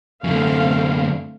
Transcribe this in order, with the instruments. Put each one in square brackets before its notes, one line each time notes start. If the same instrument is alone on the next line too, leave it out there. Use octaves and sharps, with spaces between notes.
[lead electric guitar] F#2 D3 [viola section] A3 C4 F5